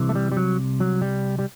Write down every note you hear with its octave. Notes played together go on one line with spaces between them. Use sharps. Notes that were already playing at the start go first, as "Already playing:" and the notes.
Already playing: C2 C3 E3
A3
G3
G3
F#3
F#3
G3
G3